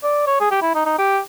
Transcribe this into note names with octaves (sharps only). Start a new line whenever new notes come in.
D5
C#5
G#4
G4
E4
D#4
D#4
G4